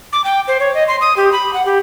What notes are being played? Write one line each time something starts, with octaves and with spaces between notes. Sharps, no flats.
D6
G5
C5
C#5
D#5
C6
D#6
G4
B5
F#5
G4